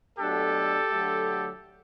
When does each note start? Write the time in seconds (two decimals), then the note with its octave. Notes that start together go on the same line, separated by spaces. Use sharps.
0.19 B2 F#3 A3 D4 G4 A4
0.91 D3 F#3 A3